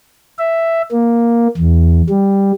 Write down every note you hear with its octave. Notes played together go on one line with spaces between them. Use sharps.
E5
A#3
E2
G3